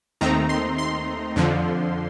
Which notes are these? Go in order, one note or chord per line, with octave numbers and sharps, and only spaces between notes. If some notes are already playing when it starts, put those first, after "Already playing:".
D#2 D#3 A3 C4 D#4 A#5
C6
C6
F2 D3 F3